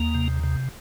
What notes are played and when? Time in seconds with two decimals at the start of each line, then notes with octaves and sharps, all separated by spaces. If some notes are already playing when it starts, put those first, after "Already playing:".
Already playing: D#2 A#3
0.15 C3
0.43 C3